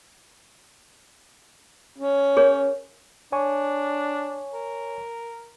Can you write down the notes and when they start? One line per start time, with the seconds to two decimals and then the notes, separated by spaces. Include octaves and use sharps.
1.98 C#4
2.37 G#4 A#4 C#5
3.32 D4 C#5 G#5 C#6
4.53 A#4